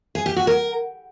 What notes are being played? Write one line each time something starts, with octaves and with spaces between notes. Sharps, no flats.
G#4
G4
F#4
A#4